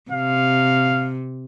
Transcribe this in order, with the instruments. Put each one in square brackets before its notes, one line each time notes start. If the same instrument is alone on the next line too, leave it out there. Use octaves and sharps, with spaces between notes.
[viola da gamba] C3 [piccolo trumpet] F5